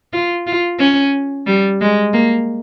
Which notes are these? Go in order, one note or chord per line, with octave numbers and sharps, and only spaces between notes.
F4
F4
C#4
G3
G#3
A#3